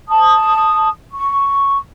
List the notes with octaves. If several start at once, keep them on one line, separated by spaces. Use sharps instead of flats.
A5 D#6
C#6